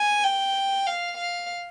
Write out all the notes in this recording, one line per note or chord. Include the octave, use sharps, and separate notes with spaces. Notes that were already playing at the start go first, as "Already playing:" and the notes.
Already playing: G#5
G5
F5
F5